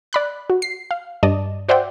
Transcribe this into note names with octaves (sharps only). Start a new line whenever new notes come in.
D5 B5 F#6
F#4
C7
F5
G2 D5 D#5 A5
F#4 C5 D5 E5 F#5 G5